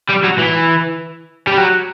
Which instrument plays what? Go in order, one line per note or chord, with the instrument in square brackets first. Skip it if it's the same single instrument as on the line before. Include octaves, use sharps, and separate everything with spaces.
[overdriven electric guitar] G3
F#3
E3
G3
F#3